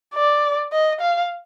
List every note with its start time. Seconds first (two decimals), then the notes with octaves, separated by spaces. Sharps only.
0.14 D5
0.72 D#5
1.00 F5